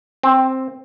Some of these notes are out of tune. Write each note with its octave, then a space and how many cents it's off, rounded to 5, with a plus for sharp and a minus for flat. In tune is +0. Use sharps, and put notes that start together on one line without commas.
C4 +5